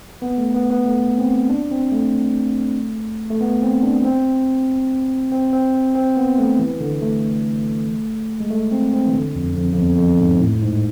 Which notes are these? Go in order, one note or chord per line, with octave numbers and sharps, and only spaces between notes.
B3
A3
B3
B3
A3
C4
D4
C4
A3
A3
B3
C4
D4
C4
C4
C4
C4
B3
A3
E3
D3
A3
G#3
A3
C4
C4
E3
D3
F2
F2
F2
E2
F2
G#2
A2
G#2